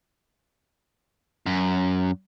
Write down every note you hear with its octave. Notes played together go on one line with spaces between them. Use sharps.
F#2